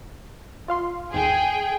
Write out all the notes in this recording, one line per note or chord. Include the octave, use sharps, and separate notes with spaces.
F4 F5 C6
G#1 D#2 G#4 G5 G#5